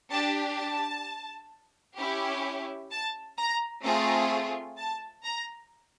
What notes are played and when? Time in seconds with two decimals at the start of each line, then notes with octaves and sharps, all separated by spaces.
0.11 D4 G4 A5
0.58 A5
1.98 C#4 E4 G4
2.91 A5
3.37 A#5
3.84 A3 C4 F4 G#4 A#5
4.77 A5
5.24 A#5